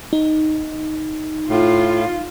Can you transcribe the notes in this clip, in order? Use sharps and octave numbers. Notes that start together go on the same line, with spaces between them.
D#4
A2 F4